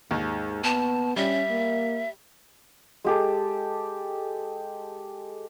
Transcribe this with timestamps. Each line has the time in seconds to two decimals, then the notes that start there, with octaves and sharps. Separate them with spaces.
0.11 D#2 G#2
0.64 B3 A5
1.16 G3 C#4 E5
1.51 A#3
3.04 G#3 G4 A4